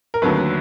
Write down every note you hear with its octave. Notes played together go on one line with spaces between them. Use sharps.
A#4
D#2 D3 F#3 A3 B4